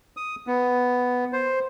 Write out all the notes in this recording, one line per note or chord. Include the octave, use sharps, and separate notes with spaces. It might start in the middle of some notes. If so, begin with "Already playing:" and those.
D#6
B3
C5